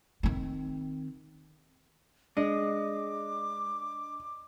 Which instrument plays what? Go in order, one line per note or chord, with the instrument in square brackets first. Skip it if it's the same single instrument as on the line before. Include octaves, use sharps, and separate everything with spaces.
[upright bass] D#3 C4
[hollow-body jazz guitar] G#3 [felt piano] D4 [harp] D#5 [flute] D6